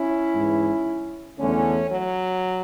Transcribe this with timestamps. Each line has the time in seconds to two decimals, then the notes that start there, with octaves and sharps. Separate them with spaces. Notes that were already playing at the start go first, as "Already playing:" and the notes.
Already playing: C#4 E4
0.33 G#2 E3
1.39 E2 D3 A3 C#4
1.92 F#3